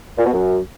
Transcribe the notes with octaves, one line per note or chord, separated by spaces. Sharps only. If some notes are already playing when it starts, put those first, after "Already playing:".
A#2
B2
F#2